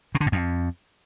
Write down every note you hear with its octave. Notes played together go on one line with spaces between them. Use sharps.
B2
D3
G#2
F2